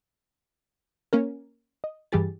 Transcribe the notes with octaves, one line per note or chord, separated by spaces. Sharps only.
A#3 C#4 A#4
D#5
G2 E3 G3 G4 G#4 A6